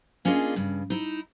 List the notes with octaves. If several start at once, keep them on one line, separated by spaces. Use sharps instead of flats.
A#3 C#4 D4 F4 G#4 D#5
G2 C#3
D#4 E4